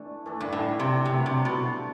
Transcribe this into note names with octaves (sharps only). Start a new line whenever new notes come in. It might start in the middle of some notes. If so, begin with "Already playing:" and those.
Already playing: E3 A3 D4 A4
E3 A3 D4 A4
G2
A2
C3
G2 C3 F#3 A3 E4
C3
B2